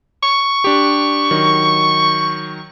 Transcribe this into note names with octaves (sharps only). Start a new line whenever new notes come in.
C#6
D4 G4
D#3 F#3